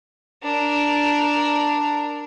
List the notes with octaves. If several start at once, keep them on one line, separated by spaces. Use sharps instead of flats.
D4 A#4